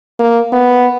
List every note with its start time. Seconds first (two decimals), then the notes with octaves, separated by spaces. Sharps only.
0.19 A#3
0.52 B3